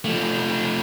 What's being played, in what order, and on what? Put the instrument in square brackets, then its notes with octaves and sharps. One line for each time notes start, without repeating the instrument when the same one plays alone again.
[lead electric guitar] F3 A3